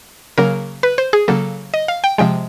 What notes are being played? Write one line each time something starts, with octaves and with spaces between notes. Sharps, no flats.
C#3 F#3 A#3 A#4
B4
C5
G#4
C#3 F#3 A#3 A4
D#5
F5
G5
C3 F3 G#3 G5